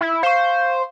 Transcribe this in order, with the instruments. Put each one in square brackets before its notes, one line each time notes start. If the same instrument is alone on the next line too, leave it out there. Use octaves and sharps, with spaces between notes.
[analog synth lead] E4
[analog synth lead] C5 [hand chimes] F5 C#6